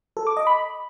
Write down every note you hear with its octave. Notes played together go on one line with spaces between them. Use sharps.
A4
D6
D#5
B5